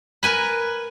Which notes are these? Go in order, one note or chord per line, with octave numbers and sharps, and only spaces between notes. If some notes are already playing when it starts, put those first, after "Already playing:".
A#4 B4 G#5 B5